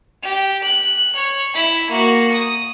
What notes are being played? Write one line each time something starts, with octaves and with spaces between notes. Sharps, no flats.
G4
F#6
C#5
E4 B5
A#3 F#4
D#6